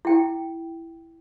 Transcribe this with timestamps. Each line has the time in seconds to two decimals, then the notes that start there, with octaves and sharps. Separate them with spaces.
0.05 E4 G5